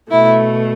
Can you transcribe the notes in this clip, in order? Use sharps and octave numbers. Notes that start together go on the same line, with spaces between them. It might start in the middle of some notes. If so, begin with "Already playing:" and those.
B2 A3 E4